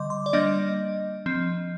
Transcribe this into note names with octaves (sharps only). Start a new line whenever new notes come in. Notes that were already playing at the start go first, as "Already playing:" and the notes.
Already playing: D3 G3 D#5 C6 D6
C6
D5
G3 A#3 D4 D#5
F3 C4